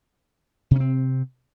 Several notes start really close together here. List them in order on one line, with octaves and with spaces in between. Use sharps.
C3 C#4 C4